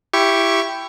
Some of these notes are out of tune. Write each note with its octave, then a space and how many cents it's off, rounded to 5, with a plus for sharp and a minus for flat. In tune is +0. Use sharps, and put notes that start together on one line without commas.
E4 +15 G4 +0 C#6 +0